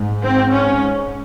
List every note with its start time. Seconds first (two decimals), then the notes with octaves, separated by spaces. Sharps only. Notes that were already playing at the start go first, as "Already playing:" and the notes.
Already playing: G#2
0.22 C4
0.50 C#4